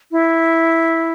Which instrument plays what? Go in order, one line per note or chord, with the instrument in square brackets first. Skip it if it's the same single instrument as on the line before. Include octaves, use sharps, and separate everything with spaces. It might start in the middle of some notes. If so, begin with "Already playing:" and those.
[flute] E4